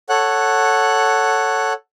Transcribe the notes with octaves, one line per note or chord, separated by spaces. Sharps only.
A4 C#5 F#5 F#6